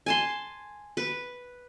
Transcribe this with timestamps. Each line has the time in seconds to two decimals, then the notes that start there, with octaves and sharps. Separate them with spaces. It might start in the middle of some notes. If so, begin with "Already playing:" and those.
0.06 G#5 A5 C6
0.97 B4